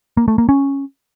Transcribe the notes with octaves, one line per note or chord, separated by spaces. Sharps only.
A#3
A3
A#3
C#4